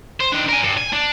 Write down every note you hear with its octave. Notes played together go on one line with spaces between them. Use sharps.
C5
D#3 D4
A#4 G#5
G2
G#5
D4